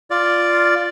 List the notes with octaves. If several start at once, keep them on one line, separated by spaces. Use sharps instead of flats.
F4 D5